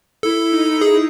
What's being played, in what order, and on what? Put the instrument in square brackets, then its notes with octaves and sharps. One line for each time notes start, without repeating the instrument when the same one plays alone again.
[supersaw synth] E4 [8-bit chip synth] A4
[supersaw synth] D#4
[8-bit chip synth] G#4